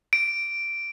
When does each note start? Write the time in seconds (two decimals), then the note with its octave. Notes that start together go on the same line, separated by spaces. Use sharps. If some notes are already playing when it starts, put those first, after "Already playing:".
0.13 D7